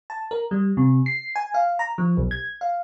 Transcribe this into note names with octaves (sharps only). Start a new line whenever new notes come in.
A5
A#4
G3
C3
C7
G#5
F5
A#5
F3
B1
G#6
F5